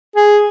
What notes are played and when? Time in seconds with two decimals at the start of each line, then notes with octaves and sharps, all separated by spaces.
0.16 G#4